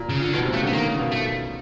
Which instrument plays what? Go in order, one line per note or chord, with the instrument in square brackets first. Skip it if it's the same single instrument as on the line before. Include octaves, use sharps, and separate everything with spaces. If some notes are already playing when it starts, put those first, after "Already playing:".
Already playing: [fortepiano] A#2
[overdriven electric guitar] C#3
D3
[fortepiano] B2 [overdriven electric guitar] D#3
[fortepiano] C3
[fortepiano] C#3 [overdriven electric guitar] A3
[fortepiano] D3
[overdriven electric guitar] B3
[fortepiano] D#3 [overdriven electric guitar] A#3
[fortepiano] C#3
B2
[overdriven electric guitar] A3